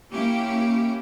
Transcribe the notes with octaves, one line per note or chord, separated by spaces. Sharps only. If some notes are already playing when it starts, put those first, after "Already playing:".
A#3 C#4 E4 G4